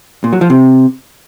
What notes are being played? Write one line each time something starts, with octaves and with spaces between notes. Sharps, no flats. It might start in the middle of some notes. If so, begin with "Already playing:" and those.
A#2
F#3
F3
C3